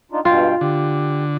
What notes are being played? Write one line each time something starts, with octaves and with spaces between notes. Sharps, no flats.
D4 D#4 F4
G2 B2 F4 G5
D3 G4